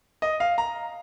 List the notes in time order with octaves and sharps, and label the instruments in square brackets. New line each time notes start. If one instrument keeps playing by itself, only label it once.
[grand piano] D#5
F5
A#5